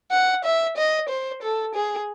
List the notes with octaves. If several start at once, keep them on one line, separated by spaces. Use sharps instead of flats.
F#5
E5
D#5
C5
A4
G#4